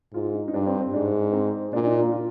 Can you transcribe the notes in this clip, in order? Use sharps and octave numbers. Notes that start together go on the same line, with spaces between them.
G#2 F4
D#4
D#4
G2 D4
C4
C4
G#2 D4
C4
A#2 D4
D#4
F4
F4